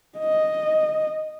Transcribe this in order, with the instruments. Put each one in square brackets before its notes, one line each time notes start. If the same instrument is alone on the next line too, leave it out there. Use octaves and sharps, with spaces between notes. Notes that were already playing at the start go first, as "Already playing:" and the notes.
[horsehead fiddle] D#5